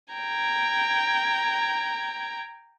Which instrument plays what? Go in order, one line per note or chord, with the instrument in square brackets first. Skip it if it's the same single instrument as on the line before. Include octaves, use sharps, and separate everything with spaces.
[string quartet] G5 A#5 G#6